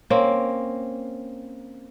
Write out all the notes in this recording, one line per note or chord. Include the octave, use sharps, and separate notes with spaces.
A#3 C4 C#4